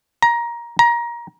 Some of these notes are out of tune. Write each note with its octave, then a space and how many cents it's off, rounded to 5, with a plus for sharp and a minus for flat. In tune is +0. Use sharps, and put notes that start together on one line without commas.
A#5 +15
A#5 +20